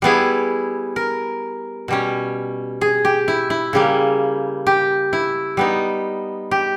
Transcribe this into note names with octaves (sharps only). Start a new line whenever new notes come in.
G3 B3 E4 G#4
A#4
B2 G3 C#4
G#4
G4
E4
E4
C#3 G3 A#3
G4
E4
G3 B3 D#4
G4